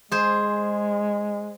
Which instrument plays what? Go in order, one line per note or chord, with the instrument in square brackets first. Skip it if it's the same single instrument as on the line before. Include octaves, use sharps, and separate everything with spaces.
[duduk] G#3 [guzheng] G#4 C5